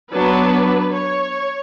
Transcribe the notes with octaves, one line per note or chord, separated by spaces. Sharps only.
F#3 B3 D4 B4
C#5